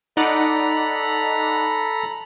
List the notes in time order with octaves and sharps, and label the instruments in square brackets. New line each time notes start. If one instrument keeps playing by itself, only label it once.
[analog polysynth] D#4 D5 F#5 [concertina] A4 A#5 [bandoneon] B5